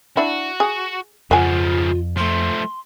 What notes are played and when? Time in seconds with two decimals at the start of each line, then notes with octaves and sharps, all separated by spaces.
0.17 D4 E4 F#4
0.60 G#4
1.31 F2 C#3 F3 F4 F#5 G#5
2.17 F3 A3 C6